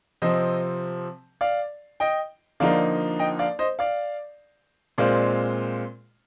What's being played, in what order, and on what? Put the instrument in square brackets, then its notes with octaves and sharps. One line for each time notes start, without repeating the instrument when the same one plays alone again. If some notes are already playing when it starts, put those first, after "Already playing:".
[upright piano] C3 F3 C4 [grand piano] C5 D#5
[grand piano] D5 F5
D#5 G5
[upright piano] D3 F3 A#3 D#4 [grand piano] D5 F5
[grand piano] D#5 G5
D5 F5
C5 D#5
D5 F5
[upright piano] A#2 G#3 C4 F4 C5 [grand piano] D5 F5